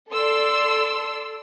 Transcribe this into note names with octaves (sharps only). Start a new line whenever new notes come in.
A4 D5 C6 E6